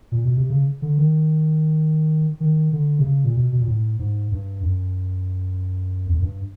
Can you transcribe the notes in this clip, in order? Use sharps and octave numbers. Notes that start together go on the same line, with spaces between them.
A#2
B2
C3
C#3
D3
D#3
D#3
D3
C3
C#3
A#2
B2
B2
A#2
A2
G#2
G2
F#2
F2
F#2
G2